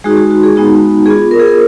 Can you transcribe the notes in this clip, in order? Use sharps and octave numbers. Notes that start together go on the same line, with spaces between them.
G#3 D#4 F#4 G#4
F#4
F#4
G#4
G#3 B3 D#4 F#4
B3 F4 G#4
A#4
G#4
A#4